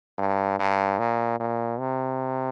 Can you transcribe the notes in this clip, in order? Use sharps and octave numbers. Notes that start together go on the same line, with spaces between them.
G2
G2
A#2
A#2
C3